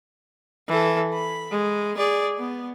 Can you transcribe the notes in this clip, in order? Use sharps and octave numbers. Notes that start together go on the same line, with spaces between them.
E3 A4
B5
G#3
G#4 D5
B3